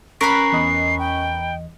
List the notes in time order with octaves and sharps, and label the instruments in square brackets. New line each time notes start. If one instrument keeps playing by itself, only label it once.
[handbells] C#4 C#6 B6 [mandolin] A#4 B4 B5 [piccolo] C7
[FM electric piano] E2 D#5
[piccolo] G5